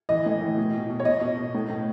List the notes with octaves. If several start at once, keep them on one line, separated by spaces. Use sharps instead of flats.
E3 D#5
A2
E3
B2
B2
B2
C#5
B2 D#5
B2
B2
A2
A2